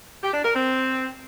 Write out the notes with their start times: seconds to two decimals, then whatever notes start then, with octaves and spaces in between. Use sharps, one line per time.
0.23 G4
0.34 D4
0.45 A#4
0.55 C4